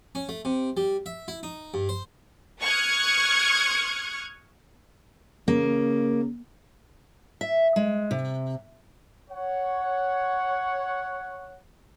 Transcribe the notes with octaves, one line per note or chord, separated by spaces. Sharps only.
C#4
A3
C3
G3
E5
E4
D#4
G2
C5
C#6 D#6 F6 F#6 G#6
C#3 A#3
E5
G#3
C3
C#5 F#5